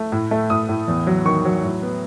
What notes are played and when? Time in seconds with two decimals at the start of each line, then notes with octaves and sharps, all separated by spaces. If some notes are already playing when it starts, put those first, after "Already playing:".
Already playing: A3
0.12 A2
0.31 A3
0.50 A2 D#6
0.69 A2
0.88 E2
1.07 F#3
1.25 D#3 C#6
1.45 F#3
1.64 A2
1.82 B3